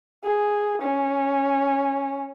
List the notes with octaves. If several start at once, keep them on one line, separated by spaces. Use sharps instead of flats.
G#4
C#4